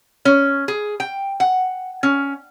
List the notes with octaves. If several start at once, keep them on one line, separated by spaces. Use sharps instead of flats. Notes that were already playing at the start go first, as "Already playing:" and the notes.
C#4
G#4
G5
F#5
C#4